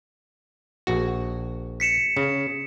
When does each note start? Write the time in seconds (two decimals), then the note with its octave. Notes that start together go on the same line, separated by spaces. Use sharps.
0.87 A#1 F#4
1.80 B6 C#7 E7
2.17 C#3